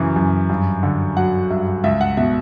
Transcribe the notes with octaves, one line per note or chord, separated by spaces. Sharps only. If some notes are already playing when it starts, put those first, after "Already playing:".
Already playing: F#2 C#3 E3
F#2
G2
D3
F#3 F#5
G2 E5
C#2 E5
F#5
B2 E5